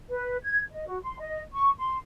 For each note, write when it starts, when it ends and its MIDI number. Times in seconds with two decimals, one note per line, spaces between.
0.09 0.36 71
0.43 0.60 92
0.71 0.87 75
0.87 0.97 66
1.02 1.17 84
1.19 1.41 75
1.53 1.70 85
1.78 1.96 84